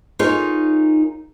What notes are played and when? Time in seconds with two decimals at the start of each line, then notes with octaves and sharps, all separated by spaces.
0.19 D#4 F4 G#4 A#4 C#5